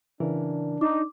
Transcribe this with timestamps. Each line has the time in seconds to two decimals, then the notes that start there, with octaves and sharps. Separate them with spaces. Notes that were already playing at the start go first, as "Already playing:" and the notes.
0.20 C#3 E3 D4 A#4
0.81 D#4 D6